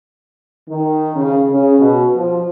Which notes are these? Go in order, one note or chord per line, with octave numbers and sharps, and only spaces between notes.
D#3
C#3
C#3
B2
F3